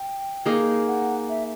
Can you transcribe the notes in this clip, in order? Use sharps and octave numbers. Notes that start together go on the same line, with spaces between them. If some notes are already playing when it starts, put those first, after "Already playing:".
Already playing: G5
A#3 D#4 G#4
F#5
E5